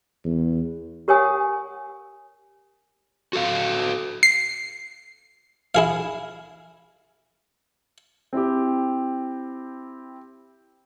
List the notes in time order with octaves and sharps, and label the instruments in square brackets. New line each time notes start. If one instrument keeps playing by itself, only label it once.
[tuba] E2
[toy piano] G4 A#4 C#5 F#5 G#5 D#6
[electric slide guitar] F#4 A4 F5
[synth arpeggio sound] C7
[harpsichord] E4 G#4 F5
[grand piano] C4 E4 G4